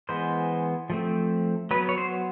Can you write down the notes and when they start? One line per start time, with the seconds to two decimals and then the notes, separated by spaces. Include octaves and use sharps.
0.09 E3 G#3 B3 C5
0.90 F3 A3 C4
1.71 F#3 B3 B4
1.89 C#5
1.98 C5